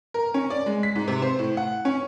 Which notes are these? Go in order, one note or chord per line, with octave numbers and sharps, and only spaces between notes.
A#4
C#4
D5
G#3
B6
G#2
C3
C5
A2
F#5
C#4